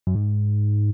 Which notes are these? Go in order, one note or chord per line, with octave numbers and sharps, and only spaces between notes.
F#2
G#2